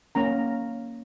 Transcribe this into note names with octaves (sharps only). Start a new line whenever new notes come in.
A#3 C#4 A#5